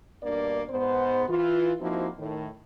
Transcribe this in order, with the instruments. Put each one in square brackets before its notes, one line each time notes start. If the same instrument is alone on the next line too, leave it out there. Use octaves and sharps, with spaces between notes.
[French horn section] G2 B2 A#3 D4 D5
G#2 B3 C5
E3 F4
F3 A#3 C4 D#4 E4 F#4
A2 D#3